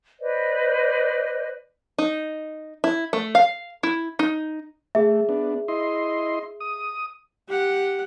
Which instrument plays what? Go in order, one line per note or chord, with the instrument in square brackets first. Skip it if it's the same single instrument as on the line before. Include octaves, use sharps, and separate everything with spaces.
[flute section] B4 C5 D5 D#5
[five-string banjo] D#4
E4
A3
F5
E4
D#4
[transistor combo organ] A3 [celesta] G#4 E5
[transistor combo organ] B3 D4
E4 D#5 C6
D#6
[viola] G4 F#5